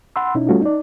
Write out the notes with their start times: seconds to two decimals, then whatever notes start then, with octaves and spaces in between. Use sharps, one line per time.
0.16 F#5 B5 C6 E6
0.35 B2 C#4 D#4 E4
0.49 G3 A3 C#4 F4 F#4
0.61 D#4 D5